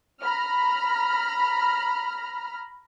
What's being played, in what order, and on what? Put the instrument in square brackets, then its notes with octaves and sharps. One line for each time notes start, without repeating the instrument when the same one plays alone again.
[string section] A#5 B5 F6